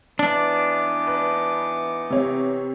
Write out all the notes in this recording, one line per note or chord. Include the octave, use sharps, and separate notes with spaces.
E3 B3 D4 D#4 D6
B4
C3 C#5